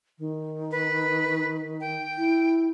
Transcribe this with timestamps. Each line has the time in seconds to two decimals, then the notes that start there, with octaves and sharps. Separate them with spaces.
0.19 D#3
0.71 B4
1.81 G5
2.18 E4